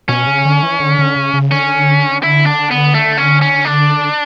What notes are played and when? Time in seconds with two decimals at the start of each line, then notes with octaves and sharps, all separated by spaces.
0.09 B2 C#4
0.27 C#3
0.45 D3
0.63 E3
0.80 D3
0.99 D3
1.16 C#3
1.34 C#3
1.51 D3 C#4
2.23 E4
2.46 D4
2.71 B3
2.94 A3
3.18 C#4
3.41 C#4
3.65 D4